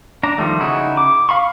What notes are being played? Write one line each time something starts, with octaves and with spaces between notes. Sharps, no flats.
D4 A#5
D#3 F3 G3 A3
C#3 D#4 E4 F#4
D6
F5 B5 C#6